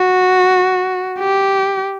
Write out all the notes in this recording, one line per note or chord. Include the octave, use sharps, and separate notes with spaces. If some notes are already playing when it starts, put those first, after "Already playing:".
Already playing: F#4
G4